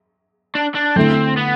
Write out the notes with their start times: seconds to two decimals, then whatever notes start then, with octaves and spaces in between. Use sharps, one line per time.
0.55 D4
0.75 D4
0.96 D3 A3 C4 E4
1.37 B3